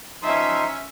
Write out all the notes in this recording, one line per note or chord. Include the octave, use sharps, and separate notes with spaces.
F3 C#4 D#4 E5 C6